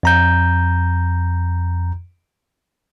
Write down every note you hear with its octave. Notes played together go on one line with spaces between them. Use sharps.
F2 A#5 G6